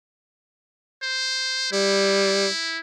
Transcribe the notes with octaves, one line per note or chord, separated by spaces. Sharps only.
C5
G3 E4